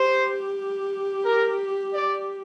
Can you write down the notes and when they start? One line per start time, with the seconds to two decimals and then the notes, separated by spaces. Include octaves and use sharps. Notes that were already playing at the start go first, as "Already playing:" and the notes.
Already playing: G4 C5
1.24 A#4
1.94 D5